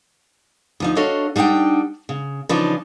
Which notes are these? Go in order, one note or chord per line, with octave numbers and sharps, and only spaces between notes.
D2 F3 D#4
D4 F#4 A4 C#5 D#5 F5
G3 D4 D#4 F#5 G5
C#3
C#3 E3 F3 D4 D#4 F4